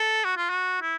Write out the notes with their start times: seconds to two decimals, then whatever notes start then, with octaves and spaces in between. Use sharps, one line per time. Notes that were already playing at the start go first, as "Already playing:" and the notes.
Already playing: A4
0.24 F#4
0.37 F4
0.50 F#4
0.82 E4